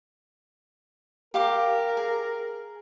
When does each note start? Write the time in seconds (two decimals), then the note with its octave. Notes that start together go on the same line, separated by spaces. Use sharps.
1.34 G4 A#4 F5 D6
1.97 G#4